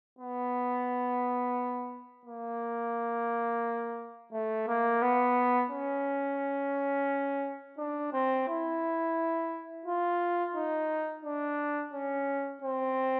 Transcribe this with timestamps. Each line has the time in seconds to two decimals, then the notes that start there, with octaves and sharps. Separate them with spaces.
0.19 B3
2.25 A#3
4.32 A3
4.68 A#3
5.02 B3
5.70 C#4
7.78 D4
8.13 C4
8.48 E4
9.86 F4
10.55 D#4
11.24 D4
11.93 C#4
12.62 C4